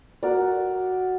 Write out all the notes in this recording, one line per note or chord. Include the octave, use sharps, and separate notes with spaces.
F#4 A#4 D5